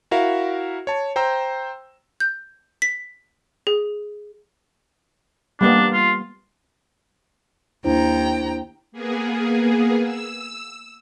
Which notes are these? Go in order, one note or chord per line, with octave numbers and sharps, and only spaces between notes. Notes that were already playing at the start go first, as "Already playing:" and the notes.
E4 F#4 A#4 E5 F5
C#5 A5
C5 G5 A#5 E6
G6
B6
G#4
G3 A#3 B3 D4
F4
D#2 D4 E4 C5 G5 A#5
A#3 B3 G#4
E6